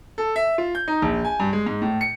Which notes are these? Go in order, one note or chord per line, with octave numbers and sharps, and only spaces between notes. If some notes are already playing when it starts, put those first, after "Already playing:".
A4
E5
F4
G6
D#4
A#1
G#5
G2
G#3
G#2
A2
C#7